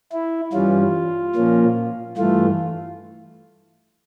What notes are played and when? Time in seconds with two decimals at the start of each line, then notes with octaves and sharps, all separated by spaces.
0.12 E4
0.53 G2 E3 G3 C#4 F4
1.35 A#2 F3 A#3 C#4
2.17 G2 E3 A3 F4